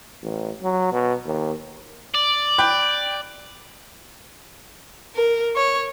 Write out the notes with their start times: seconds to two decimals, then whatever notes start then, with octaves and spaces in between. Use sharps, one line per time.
0.22 A1
0.63 F#3
0.92 B2
1.25 D#2
2.15 D5
2.58 G5 B5 F#6
5.16 A#4
5.56 C#5